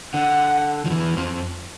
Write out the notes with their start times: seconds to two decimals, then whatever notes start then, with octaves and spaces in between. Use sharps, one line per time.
0.13 D3 F#5
0.86 F3
0.91 E2 E3
1.17 F2 F3